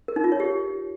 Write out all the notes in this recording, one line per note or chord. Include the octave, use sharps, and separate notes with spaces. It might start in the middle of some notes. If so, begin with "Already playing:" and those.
A#4
D#4
F4
C#5
G4